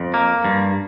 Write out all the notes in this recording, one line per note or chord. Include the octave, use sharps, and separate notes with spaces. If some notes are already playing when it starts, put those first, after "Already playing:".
Already playing: F2
A#3
G2